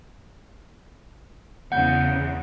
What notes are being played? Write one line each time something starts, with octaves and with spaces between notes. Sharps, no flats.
E2 C#3 F#5 G6